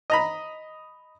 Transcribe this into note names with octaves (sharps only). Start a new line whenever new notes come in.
D#5 A#5 B5